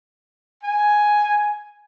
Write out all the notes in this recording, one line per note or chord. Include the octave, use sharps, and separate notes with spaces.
G#5